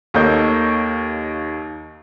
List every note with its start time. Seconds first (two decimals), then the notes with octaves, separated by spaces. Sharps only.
0.14 D#2 A#3 A4 C#5 D#5 G6